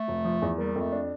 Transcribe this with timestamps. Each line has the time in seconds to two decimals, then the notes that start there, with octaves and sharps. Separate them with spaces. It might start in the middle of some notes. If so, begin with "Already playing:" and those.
Already playing: A3
0.08 F1
0.25 F3
0.42 E2
0.58 G3 A#3
0.76 F2
0.81 A3
0.92 D4